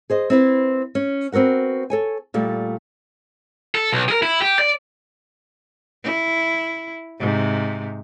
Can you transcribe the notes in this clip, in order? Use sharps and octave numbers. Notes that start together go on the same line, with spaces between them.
G#4 C5 D#5
C4 E4 B4
C#4
B3 C4 F#4 A#4 F#5
A4 C#5 G#5
A#2 G3 A3
A4
B1
G#4 A#4
E4
G4
D5
E4
G#2 C3